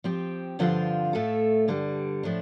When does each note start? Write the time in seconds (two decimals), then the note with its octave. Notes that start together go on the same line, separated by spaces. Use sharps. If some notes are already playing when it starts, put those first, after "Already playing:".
0.04 F3 C4 G4
0.59 G2 D3 F3 C4 F4
1.13 A2 A3 F4 A4
1.68 G2 D3 G3
2.23 A2 F3 D4